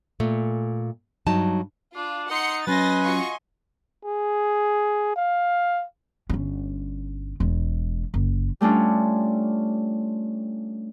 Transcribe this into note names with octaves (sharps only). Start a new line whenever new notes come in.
A#2 A3
G2 F#3 D#4 A5
D4 F4
D#4 F#5 C6 C#7
F#3 C#4 B4 D#5 G#5 C6 A6 A#6
F4 F#4 C#6
G#4
F5
G1 C#4
E1 G#3
F#1
G3 A3 C#4 D4 F4